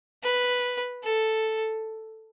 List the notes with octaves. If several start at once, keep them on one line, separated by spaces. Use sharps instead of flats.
B4
A4